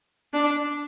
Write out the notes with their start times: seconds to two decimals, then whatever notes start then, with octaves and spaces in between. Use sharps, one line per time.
0.33 D4